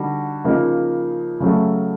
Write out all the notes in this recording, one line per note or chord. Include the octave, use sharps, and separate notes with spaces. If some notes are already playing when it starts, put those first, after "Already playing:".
Already playing: D3 G3 D#4 F#4
C#3 F3 A#3 D#4
C#3 F#3 A3